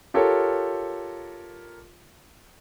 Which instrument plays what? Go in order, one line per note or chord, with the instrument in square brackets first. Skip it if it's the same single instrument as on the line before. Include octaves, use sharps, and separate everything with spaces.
[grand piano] F4 G4 A4 A#4 C#5